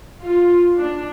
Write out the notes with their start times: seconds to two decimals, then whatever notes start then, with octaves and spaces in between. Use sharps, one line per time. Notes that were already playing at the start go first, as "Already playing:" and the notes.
0.21 F4
0.77 D4